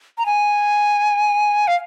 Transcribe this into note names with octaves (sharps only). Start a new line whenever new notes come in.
A#5
G#5
F5